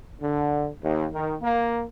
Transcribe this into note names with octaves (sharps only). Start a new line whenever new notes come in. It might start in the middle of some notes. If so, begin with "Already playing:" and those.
D3
D#2
D#3
A#3